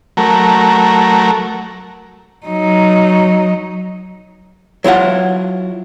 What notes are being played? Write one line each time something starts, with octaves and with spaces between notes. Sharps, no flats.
F#3 A3 A#4
F#3 D#4
F#3 E4 F4 F#5